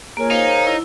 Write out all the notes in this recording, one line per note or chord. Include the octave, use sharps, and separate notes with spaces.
A#3 F4 G#4 A#4 C#5
D#4 C5 F5
E4